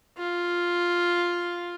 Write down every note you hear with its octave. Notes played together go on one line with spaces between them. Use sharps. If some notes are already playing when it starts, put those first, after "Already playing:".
F4